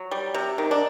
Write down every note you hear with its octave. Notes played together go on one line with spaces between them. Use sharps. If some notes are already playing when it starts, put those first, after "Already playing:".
Already playing: F#3
G3
C3
D#3
D4